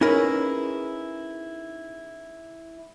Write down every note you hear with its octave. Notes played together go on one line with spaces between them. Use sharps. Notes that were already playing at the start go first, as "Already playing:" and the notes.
C#4 D#4 E4 G#4 A#4 B4